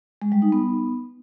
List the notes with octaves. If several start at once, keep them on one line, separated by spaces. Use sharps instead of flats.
G#3
G3
D#4
B3